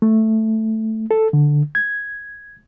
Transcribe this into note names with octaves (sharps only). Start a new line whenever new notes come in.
A3
A4
D3
G#6